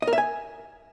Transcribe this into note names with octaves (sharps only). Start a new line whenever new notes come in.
D#5
A#4
E5
G#5